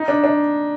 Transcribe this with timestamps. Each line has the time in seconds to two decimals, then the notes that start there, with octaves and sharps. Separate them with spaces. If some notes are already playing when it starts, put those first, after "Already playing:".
Already playing: D#4
0.08 D4
0.24 D4